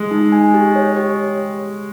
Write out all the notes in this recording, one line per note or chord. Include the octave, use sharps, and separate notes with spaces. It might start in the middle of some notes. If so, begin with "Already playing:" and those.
Already playing: G#3
D#4
G#5
G4
C#5
G4